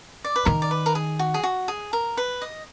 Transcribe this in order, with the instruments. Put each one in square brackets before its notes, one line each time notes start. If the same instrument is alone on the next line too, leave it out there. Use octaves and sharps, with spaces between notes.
[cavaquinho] D5
B4
[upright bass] D#3 [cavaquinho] A#4
[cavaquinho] D5
B4
A#4
G#4
F#4
G#4
F#4
G#4
A#4
B4
D#5